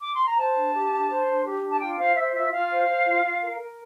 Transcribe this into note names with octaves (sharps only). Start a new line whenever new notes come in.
D6
C6
A#5
C5 A5
D4
G4
D4
C5
D4
G4
D4
A5
F4 G5
C5 F5
C5 E5
F4 E5
F4 F5
C5
C5
F4
F4
A#4
A#4